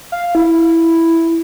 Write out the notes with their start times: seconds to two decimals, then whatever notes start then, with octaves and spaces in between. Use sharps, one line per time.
0.12 F5
0.35 E4